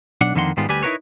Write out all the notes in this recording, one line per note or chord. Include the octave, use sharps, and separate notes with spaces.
B1 D4 F#5
F2 D3 D#3 A#3 F#5 C6
G#2 D#3 G3 G#3 B3 F4
D2 G3 G4 B4 G#5
D#4 E4 G4 A#4 B4 C#5